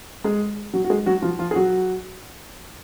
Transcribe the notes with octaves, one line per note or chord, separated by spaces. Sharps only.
G#3 G#4
F#3 F#4
F#4
G#3 G#4
F#3 F#4
F3 F4
F3 F4
G#4
F#3 F#4